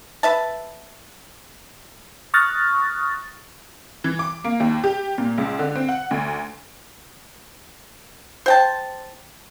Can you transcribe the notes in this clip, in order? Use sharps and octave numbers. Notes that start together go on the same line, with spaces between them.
B4 E5 A5
C#6 D#6 F6 F#6 A6 A#6
E3
D6
A#3
D#2
G4
A#2
C#2
D3
C4
F#5
D2
C5 G5 A5